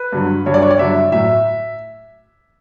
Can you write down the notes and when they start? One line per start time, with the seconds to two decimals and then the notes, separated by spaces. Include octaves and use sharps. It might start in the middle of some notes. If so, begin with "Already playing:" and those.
Already playing: B4
0.12 G2 D3 F#3
0.46 G2 D3 F#3 C#5
0.54 D5
0.62 C#5
0.71 D5
0.79 G2 D3 F#3 E5
1.12 A2 F#3 A3 E5